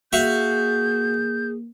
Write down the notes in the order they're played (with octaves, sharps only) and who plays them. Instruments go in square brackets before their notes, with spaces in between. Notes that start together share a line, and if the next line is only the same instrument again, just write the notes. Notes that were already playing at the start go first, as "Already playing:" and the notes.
[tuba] A#3 [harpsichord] F#4 E5 F5 [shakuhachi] G#4 [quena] G6